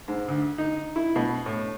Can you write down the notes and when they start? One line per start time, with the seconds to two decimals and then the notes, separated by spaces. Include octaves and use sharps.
0.08 G#2
0.28 D2
0.58 D#4
0.96 E4
1.16 B2
1.46 A2